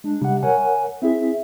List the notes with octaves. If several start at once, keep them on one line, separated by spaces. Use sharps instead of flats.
G#3 D4
C3 G3 F#5
A#4 C#5 F#5 G#5
C4 E4 G#4 E5